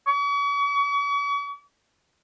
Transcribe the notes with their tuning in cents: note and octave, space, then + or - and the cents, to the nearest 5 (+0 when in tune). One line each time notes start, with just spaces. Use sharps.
C#6 +45